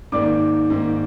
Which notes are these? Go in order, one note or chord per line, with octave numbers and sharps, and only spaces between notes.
G#2 D#3 A#3 D5 D6
G#2 D#3 A#3